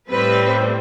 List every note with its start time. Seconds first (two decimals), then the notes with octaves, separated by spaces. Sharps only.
0.10 A2 G3 C4 B4